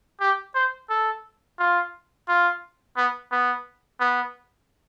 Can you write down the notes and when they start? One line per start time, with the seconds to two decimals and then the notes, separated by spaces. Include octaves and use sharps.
0.21 G4
0.55 C5
0.90 A4
1.59 F4
2.28 F4
2.97 B3
3.32 B3
4.00 B3